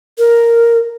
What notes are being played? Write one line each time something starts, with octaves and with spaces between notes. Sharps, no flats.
A#4